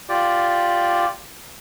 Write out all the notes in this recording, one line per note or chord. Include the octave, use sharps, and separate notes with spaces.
F4 G4 D5